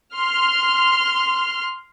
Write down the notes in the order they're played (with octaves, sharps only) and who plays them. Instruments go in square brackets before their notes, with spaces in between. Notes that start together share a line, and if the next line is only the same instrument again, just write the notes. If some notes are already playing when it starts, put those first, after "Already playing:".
[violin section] C6 F6